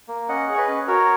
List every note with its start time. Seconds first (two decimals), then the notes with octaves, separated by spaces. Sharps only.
0.08 A#3
0.29 C#4 D#5 F#5
0.48 G#4
0.54 C#5
0.57 B4 D#5
0.68 C#4
0.87 F#4 A#4 C#5